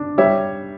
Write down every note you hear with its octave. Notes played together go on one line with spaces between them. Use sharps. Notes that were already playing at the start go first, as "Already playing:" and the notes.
Already playing: D4
G3 C#5 E5